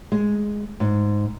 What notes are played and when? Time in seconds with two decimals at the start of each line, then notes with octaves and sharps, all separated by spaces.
0.12 G#3
0.80 G#2